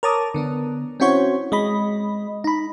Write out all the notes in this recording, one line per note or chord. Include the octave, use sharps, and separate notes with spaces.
A#4 C#5 A5 A#5 D6 D#6
D3 B3 D4
C4 C#4 E4 F#4 C5 C#5
G#3 D#5 B5
D#4 B5